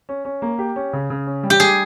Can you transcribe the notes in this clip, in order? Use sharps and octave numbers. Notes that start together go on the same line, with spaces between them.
C#4
C#4
A#3
G4
C#4
C#3
C#3
C#4
G3
G4
G3 G#4